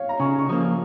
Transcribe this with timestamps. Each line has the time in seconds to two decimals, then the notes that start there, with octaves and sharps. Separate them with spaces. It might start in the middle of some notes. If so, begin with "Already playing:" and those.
Already playing: C#5 F5
0.09 A#5
0.20 C#3 G#5 C#6
0.39 C#6
0.49 F3 A#3 A#5 D#6